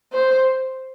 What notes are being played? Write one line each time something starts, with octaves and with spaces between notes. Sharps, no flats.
C5